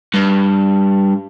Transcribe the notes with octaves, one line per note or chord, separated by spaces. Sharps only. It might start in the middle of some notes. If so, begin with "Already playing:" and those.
G2